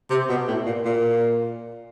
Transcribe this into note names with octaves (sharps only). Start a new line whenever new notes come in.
C3
B2
A2
A#2
A#2